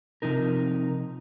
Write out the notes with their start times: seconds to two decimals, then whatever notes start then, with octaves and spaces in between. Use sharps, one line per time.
0.22 C3 F3 D#4 A#4